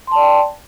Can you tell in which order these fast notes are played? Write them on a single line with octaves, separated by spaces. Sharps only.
C6 A5 D5 G5